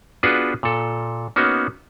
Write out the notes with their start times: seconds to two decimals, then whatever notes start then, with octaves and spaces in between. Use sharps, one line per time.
0.23 B3 D4 F4 F#4 G#4 B4
0.63 A#2 A4
1.36 A#3 B3 C#4 D#4 F#4